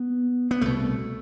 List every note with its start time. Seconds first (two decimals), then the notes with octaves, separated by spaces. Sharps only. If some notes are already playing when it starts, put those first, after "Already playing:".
Already playing: B3
0.51 B3
0.61 C2 B2 A3